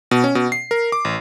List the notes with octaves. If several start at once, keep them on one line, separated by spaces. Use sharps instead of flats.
B2
C#4
B2
C7
A#4
D6
A1